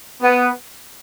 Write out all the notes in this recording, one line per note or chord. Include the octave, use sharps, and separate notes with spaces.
B3